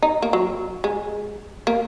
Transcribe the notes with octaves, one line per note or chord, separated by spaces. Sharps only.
D#4
A#3
F#3
G#3
A#3